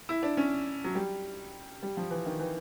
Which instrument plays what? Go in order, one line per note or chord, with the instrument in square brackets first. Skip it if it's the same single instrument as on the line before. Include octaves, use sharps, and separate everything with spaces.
[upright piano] E4
D4
C#4
F#3
G3
G3
F3
E3
D#3
E3